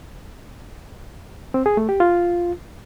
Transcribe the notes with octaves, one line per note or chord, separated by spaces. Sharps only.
C4
G#4
A3
G4
F4